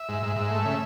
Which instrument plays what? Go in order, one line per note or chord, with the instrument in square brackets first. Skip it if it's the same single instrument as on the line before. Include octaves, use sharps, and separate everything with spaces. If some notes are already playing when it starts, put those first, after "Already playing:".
Already playing: [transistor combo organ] E5
G#2
G#2
G#2
A3
C#3